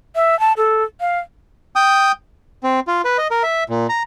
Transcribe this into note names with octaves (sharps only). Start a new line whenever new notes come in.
E5
A5
A4
F5
G5 D#6
C4
F4
B4
D#5
A#4
E5
A#2
A#5